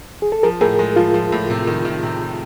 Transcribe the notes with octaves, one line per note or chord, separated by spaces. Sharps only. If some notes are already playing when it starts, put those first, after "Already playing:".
G#4
A4
F3 G#4 A#4
A2 G#4 A#4
G#3
F3 F4
F3
A2
C3
D#3
D#3
C3